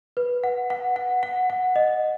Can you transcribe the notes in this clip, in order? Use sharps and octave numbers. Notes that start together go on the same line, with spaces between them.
B4
F#5
F#5
F#5
F#5
F#5
D#5